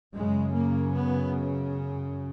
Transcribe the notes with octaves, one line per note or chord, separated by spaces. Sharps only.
F#2 C#3 G#3
A#3
B3